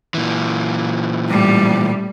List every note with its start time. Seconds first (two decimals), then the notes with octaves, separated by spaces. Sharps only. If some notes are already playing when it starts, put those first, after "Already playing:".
0.14 A#2 E3
1.28 A2 G3